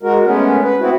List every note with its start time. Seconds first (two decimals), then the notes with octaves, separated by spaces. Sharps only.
0.03 G#3 F#4 A#4
0.25 G#3 A3 B3 C#4
0.63 B4
0.80 B3 C4 E4 F#4